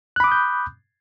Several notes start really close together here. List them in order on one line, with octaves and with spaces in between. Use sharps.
F#6 B5 D6 D#6 G6